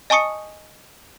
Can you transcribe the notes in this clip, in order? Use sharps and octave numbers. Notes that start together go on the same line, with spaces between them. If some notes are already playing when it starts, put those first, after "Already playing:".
D#5 G#5 A5 C#6 D#6 C#7